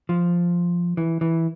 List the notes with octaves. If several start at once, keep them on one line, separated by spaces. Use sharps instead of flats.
F3
E3
E3